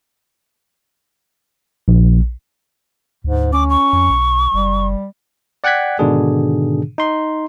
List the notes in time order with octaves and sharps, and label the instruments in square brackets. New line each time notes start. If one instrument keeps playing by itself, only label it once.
[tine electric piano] A#1
[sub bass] D2 [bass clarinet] G#2
[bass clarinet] C#4 [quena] D6
[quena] C#6
[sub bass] F2
B1
[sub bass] F#1 [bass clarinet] G3
[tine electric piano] D5 F#5 G5 F#6 G#6 B6
G#2 B2 D3 D#3 D4 G#4
D#4 C6